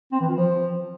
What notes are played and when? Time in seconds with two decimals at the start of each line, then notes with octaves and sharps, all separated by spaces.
0.12 C4
0.21 E3
0.29 F4
0.37 F3